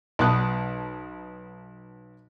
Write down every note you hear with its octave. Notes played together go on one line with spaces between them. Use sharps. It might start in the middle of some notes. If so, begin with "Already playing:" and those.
B1 B3 A5 D#6 F#6